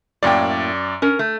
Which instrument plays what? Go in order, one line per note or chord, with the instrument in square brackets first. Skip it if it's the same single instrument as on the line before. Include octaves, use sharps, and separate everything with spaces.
[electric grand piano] F#2 D5 [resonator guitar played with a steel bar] A2 A#3 G5
[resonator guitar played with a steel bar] C#4 A#4
A3